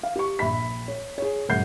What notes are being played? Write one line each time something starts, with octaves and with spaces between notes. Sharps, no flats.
F5
G4 C#6
A#1 E5 B5 B6
C#5
G#4 C#5
D#1 F#2 G#3 F#5 G6 C7